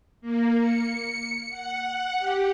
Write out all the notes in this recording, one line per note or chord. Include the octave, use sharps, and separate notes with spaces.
A#3
C#7
F#5
G4